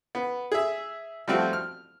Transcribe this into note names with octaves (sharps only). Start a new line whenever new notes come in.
B3
G#4 E5
F3 G3 A3 C4 F#4
F6